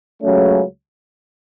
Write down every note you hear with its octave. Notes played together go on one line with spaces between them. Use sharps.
C#2 C#3 F#3 A3 C#4